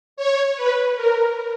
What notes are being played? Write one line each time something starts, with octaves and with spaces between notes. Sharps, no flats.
C#5
B4
A#4